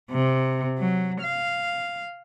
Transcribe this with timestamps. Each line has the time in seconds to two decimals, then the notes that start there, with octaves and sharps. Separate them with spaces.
0.11 C3
0.79 F#3
1.22 F5